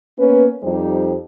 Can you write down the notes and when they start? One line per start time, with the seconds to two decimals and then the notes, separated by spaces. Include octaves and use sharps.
0.18 A#3 B3 C#4 B4
0.63 F2 G3 D#4 G4 C5